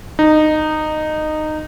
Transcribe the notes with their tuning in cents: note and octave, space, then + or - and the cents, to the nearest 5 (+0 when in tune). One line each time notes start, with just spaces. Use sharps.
D#4 -15